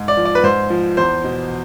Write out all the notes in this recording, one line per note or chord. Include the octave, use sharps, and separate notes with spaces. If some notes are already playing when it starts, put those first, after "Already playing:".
Already playing: G#2
D5
F3
D5
B4
G#2 C5
F3
E2 C5
B2